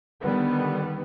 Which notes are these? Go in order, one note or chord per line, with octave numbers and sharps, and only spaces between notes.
D3 D#3 G3 B3